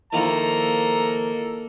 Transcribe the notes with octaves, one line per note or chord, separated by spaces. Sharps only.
D#3 F3 A#3 E4 A4 A#5